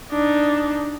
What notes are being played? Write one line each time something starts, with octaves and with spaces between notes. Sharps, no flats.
D4 D#4